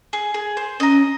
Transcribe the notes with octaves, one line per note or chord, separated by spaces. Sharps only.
G#4
G#4
C5
C#4 D#5 A#5